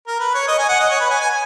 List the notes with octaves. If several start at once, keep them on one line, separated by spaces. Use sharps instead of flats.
A#4
B4
C#5
D#5
G#5
F#5
D#5
C#5
B4
G#5
G#5